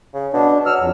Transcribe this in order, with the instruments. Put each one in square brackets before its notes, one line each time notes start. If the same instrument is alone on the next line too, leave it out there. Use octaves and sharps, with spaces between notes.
[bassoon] C#3
[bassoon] B2 [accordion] D4
[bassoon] F#3 [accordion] E6 F6
[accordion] F2